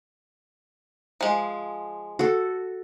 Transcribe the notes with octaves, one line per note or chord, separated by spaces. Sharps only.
F3 G#3
F#4 A4